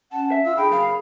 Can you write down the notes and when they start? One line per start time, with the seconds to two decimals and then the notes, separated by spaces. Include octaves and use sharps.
0.12 C#4 F#5 A5
0.32 E5
0.45 F4 F5 E6
0.57 D3 G#4 G5 B5
0.71 F#2 C#3 F5